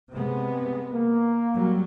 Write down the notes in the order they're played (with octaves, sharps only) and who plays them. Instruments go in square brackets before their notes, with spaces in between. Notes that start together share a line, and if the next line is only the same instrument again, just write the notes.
[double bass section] C3 G#3 B3
[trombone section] A#3
[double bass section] F#3 G3